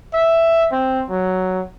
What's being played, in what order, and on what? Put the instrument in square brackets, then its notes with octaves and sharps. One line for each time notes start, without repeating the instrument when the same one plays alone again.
[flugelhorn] E5
C4
F#3